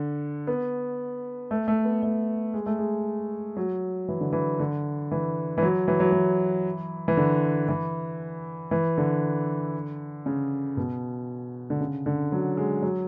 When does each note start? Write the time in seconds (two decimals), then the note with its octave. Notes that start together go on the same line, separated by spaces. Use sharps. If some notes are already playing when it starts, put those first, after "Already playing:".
Already playing: D3
0.47 B3
1.51 A3
1.68 A3
1.85 B3
2.03 A3
2.54 G#3
2.66 A3
2.78 G#3
3.57 F#3
4.08 E3
4.21 D3
4.33 E3
4.60 D3
5.11 E3
5.58 E3
5.63 F#3
5.88 E3
6.00 F#3
6.12 E3
7.08 E3
7.17 D3
7.69 E3
8.71 E3
8.98 D3
10.26 C#3
10.77 B2
11.70 D3
11.80 C#3
12.06 D3
12.32 F#3
12.57 G#3
12.82 F#3